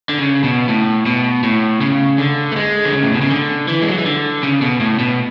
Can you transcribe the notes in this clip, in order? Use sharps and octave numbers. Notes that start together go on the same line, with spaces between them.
D3
C#3
B2
A2
B2
A2
C#3
D3
A3
G#3
D3
C#3
A2
B2
C#3
D3
E3
G#3
F#3
E3
D3
C#3
B2
A2
B2